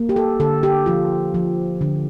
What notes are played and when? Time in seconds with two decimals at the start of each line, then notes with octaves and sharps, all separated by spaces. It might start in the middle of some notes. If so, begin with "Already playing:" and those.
Already playing: A#3
0.09 G4
0.16 A4
0.40 D3 A4
0.63 G4
0.86 F3 F4
1.34 F3
1.81 D3